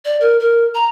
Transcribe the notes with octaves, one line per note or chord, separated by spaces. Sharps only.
D5
A#4
A#4
A#5